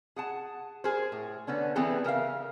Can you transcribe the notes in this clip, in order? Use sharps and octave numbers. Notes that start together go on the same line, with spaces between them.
G#4 F#5 A5
G#4 A#4 C5
A2
D3 B3 C#4 D4
E3 G3 B3 C4 G#4 A4
C#3 A#4 E5 F5